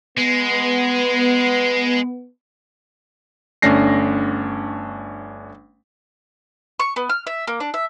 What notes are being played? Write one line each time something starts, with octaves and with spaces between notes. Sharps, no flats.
G#3 B3
G1 A3 C#4 D4 A#6 C7
C#6
B3
F6
E5
A#3
D4
E5